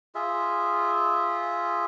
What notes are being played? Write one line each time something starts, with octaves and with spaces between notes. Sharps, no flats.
F4 G#4 E5